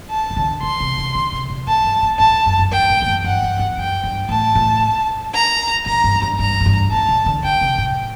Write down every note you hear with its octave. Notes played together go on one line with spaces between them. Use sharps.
A5
D#3
D3
D3 C6
C3
D#3
D3
C3
A#2
A#2 A5
G2
A#2
A2 A5
F#2
G2
G2 G5
A2
G2
F#2
G2 F#5
G2
F#2
F#2 G5
G2
A2 A5
A2
A#5
A#2 A#5
G2
G2
G2 A#5
F#2
G2
A2 A5
A#2
D3
D3 G5
C3
A2